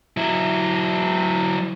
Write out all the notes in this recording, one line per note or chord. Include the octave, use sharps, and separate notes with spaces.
F#3 E4